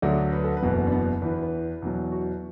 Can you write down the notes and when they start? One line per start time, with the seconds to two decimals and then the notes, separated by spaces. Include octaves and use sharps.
0.02 D2 D3 F#3 D5
0.32 B4
0.44 A4
0.57 B4
0.63 F#1 E2 B2
0.87 D4
0.92 B3
1.22 E2 E3 B4
1.32 B4
1.43 B4
1.82 E2 B2 F#3
2.12 F#4